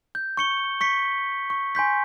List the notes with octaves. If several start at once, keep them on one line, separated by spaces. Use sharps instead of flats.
G6
C#6 C#7 G7
C#6 B6 C#7
C#6
G#5 C6 G6 B6